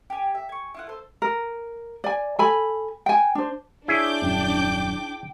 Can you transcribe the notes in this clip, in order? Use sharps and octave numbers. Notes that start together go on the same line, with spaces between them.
G4 G#5
E5
G#5 C#6
E4 F4 F#5
A4 C5
A#4
D5 G#5
A4 G#5 B5
G5 G#5
D4 C5
D4 E4 G#4 C#5 D6 G6
D#1 F#2 C#4 G5